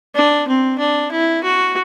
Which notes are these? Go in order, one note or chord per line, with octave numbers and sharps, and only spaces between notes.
D4
C4
D4
E4
F#4